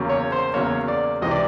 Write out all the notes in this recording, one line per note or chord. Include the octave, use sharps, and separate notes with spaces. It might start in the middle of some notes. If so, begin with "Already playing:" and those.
Already playing: E2 C#3 F#3 A#3
C#5
C5
E2 C#3 F#3 A#3 C#5
D5
C#2 C3 E3 D#5
D5